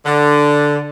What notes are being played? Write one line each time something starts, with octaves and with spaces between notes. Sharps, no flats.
D3